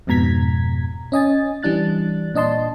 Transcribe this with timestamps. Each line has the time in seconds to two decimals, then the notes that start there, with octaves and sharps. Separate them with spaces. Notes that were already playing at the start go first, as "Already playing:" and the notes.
0.07 F2 G#2 B2 A#5 G#6 B6
1.12 C#4 D#5 G#5 A6
1.63 E3 G3 D4 F#6 A6
2.34 A#2 D4 D#5 A5 C6